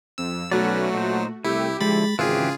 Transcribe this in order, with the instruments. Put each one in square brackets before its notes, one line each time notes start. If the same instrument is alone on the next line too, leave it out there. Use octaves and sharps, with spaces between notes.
[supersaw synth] F2 [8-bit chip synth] E6
[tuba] B1 [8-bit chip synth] F#3 [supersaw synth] A3 F#4 [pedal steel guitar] C#4 B4 D5
[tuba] A#2 [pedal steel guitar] D#4 C5
[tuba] C2 [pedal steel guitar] A3 [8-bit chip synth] E4 [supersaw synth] G4
[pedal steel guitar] D3 F3 E4 [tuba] G#3 [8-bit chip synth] B5 A6
[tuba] G#1 [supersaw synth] C#3 [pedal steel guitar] E3 G4 [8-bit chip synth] F4 G#4